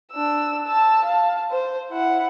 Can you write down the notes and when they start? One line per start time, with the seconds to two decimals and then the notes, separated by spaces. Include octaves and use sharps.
0.12 D4 E6
0.67 A5 E6
1.05 F5 A5
1.51 C5
1.91 E4 F#5